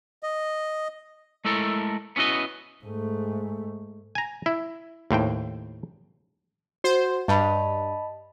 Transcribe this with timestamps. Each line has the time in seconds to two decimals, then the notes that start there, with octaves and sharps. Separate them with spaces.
0.23 D#5
1.45 G#3 A3 E4 A4 A#4
2.16 B3 C#4 E4 F#4 D#5
2.84 G#2 A3
4.15 G#5 A#5
4.46 E4
5.11 D#2 A2 C5 G5
6.84 F#4 C5
7.28 G2 D#5 A5 B5